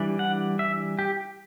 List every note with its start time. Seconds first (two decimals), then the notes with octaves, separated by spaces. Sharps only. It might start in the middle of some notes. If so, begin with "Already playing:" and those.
Already playing: E3 G3 D4
0.19 F#5
0.59 E5
0.99 G4